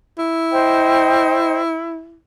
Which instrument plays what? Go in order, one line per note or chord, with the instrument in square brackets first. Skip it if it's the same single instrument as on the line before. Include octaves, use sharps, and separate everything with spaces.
[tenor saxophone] E4
[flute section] C5 D#5 G5